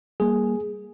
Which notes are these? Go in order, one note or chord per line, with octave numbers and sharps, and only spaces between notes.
G3 A#3 G#4